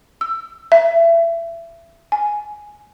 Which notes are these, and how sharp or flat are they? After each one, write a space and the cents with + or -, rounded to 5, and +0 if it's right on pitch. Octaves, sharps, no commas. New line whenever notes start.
E6 +15
E5 +25
G#5 +10